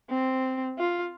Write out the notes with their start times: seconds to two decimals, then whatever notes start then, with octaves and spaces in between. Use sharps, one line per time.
0.10 C4
0.79 F4